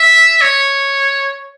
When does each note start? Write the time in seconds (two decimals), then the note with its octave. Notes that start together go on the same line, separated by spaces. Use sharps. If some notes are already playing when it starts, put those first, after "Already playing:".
Already playing: E5
0.41 C#5